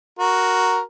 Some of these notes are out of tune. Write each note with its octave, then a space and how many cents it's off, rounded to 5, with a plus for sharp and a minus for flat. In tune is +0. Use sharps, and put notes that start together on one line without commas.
F#4 +0 A#4 +0